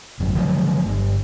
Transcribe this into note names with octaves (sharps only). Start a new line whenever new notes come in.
G#1 F#2
D3 F3 F#3 A3
G1